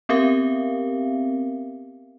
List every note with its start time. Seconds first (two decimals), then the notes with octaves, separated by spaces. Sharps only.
0.09 B3 C4 G4 A#4 E5 F5